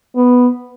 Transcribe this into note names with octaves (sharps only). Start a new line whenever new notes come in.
B3